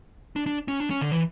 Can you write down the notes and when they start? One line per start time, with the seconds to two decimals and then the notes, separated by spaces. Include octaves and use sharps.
0.36 D4
0.46 D4
0.68 C#4
0.80 D4
0.90 C#4
1.01 D3
1.12 E3